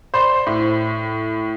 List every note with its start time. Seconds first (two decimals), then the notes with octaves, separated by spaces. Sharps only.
0.14 C5 D5 B5 C6
0.47 A2